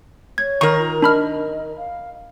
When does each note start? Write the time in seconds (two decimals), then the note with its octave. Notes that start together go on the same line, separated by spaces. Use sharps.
0.38 C#5 G#6
0.61 D#3 A#4 C#6
0.78 F4
1.02 D4 D#5 B5 F6
1.77 F5